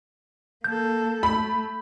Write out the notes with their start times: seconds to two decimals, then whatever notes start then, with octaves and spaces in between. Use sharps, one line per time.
0.64 A#3 A4 G6
1.23 A3 B5